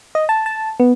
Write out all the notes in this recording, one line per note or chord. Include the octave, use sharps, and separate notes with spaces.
D#5
A5
A5
B3